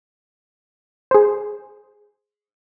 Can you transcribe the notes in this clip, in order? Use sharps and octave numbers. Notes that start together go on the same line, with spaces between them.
G#4 C5